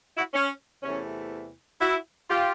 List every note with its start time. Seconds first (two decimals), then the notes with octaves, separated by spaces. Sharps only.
0.17 E4 F#4
0.34 C#4
0.82 E2 C3 E3 A3 C#4
1.80 E4 F#4
2.29 F4 G4